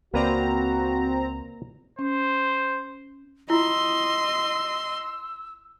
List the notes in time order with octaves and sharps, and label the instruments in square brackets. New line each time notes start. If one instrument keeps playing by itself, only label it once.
[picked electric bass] C#2 [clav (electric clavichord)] A#3 B4 D5 [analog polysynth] C4 A#5 [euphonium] F#4
[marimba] C#4 [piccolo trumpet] C5
[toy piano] E4 F4 [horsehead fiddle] D#5 [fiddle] C6 [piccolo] E6